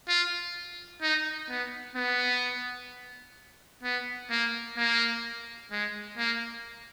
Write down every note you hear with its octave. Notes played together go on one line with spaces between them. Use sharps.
F4
D#4
B3
B3
B3
A#3
A#3
G#3
A#3